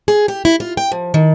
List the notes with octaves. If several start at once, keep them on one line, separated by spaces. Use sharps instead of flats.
G#4
G4
E4
F4
G5
F3
D#3